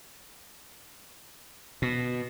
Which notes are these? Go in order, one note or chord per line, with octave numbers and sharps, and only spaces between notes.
B2